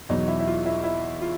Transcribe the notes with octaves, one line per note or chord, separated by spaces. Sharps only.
E2 B2 F#3 D#4
E4
E4
F4
E4
E4
F4